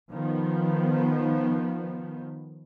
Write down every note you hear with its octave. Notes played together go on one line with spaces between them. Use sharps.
D#3 F3 B3